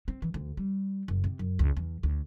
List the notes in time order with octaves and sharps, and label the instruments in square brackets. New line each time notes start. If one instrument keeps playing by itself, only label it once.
[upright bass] C4
E3
D2
G3
F#1
C3
F#2
C#2
E2
D2